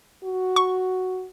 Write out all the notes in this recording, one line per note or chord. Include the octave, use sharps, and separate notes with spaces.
F#4
C#6